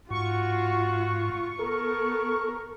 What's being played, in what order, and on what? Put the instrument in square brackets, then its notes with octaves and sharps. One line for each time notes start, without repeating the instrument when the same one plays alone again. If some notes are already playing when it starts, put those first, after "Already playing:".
[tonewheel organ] G#2 [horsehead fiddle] F4 [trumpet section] F#4 [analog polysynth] C#6
[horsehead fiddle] B3 [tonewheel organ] A4 [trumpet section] A#4